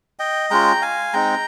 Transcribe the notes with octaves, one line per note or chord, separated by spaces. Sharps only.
D#5 G5
G#3 C#4 F4 G5 A#5
F5 G#5
G#3 C4 D#4 G5 A#5